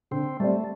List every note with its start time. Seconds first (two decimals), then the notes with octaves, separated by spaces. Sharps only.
0.11 D3 C4
0.40 G3 A3 C4 G4 D5